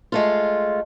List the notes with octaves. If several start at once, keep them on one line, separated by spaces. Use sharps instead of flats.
G#3 A3 F4